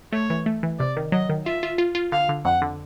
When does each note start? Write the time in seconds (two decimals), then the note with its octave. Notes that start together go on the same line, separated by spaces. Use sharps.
0.12 A3 C#5
0.30 E3
0.46 A3
0.63 E3
0.79 C3 D5
0.97 D#3
1.12 F#3 D#5
1.29 D#3
1.46 F4 E5
1.63 F4
1.78 F4
1.95 F4
2.12 D3 F5
2.29 D3
2.45 F2 F#5
2.62 D3